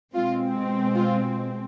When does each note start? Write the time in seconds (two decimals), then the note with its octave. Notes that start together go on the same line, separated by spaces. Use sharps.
0.15 B2 G#3 C4 F4
0.96 F4